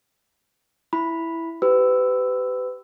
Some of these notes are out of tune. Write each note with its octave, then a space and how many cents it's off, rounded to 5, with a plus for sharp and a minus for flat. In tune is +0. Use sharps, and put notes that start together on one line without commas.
E4 +0 B5 +0
G4 -20 B4 +30 E6 +0